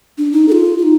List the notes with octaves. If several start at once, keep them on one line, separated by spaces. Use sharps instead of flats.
D4
D#4
A4
F4
F4
D#4